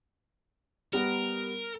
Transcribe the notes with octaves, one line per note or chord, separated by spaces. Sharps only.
G3 B3 A#4